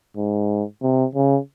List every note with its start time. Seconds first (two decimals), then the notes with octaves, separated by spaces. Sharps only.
0.17 G#2
0.82 C3
1.15 C#3